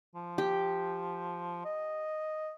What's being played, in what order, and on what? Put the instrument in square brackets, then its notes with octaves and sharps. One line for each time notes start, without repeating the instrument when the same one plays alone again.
[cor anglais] F3
[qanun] G4
[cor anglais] D#5